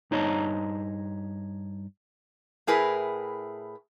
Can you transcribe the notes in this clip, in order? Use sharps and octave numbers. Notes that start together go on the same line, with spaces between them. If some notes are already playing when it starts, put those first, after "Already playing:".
G2 D#4 C#5 D#5 A5 A#5
A2 E4 G#4 A#4 B4